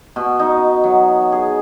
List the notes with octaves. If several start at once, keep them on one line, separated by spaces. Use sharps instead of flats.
B2
D#4
F#3
G#4